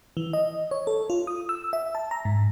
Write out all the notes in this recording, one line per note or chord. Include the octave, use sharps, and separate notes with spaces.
E3
D#5
C#5
A4
F4
D#6
E6
E5
A5
A#5
G#2